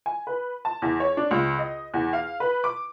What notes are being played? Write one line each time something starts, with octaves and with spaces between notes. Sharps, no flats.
G#5
B4
A5
E2
C#5
D4
C#2
D#5
E2
F5
B4
D6